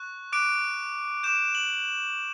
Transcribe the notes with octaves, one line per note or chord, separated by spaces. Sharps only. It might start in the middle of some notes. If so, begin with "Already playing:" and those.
Already playing: C#6 F#6
D6 F#6 D7
D6 G6 E7
F#7